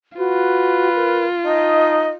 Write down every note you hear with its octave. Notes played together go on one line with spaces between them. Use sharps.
F4 F#4 B4
A#4
D#4 D#5 A5